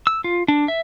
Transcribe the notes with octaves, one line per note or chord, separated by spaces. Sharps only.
E6
F4
D4
E5